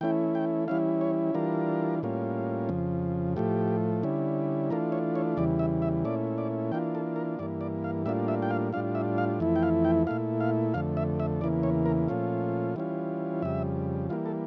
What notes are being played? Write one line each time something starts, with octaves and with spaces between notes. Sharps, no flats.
E3 A3 C#4 E4 G5
G5
E3 G3 C#4 E4 F5
C#5
E3 G3 D4 F4 A#4
A2 G3 A#3 C#4 F4
F2 C#3 F3
A2 F3 A3 G4
D3 G3 C#4 E4
E3 A3 D4 F4 A#4
C#5
C#5
E2 C#3 E3 G3 D5
E5
E5
A#2 A3 C#4 E4 D5
D5
E3 A#3 D4 F4 G5
A4
A#4
G2 E3 A#3 D5
D5
F5
A2 G3 A#3 D4 F4 E5
E5
G5
F5
A2 G3 D4 F4 F5
E5
F5
F2 E3 A3 E4
G5
F5
G5
A#2 A3 E4 F5
F5
F2 D3 A3 F5
E5
E5
E2 C#3 E3 A#3 D5
C#5
A#4
A#2 F3 A3 C#4 F4
E3 G3 C#4 F4
F2 C#3 G3 E5
E3 G3 A#3 F4
A4